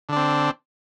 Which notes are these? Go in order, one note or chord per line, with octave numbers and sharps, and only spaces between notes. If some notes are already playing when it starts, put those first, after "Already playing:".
D3 C4 D4